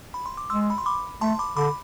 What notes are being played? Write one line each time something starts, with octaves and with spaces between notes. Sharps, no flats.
B5
C6
D6
G#3 C6 E6
B5
C6
B5 D6
A3 A5 C6
B5 D6
D3 B5 D6